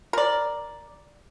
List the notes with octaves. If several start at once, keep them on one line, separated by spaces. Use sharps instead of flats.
A#4 D5